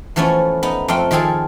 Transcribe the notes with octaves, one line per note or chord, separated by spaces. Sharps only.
E3 F3 A3 B3 C#4
B3 D#4
F2 A3 C4 F5 G5 C6
D#3 F3 C4 G#4 A4